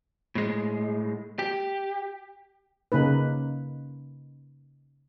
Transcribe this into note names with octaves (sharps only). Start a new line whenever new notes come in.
A2 G#3
G4
C#3 A#3 D#4 B4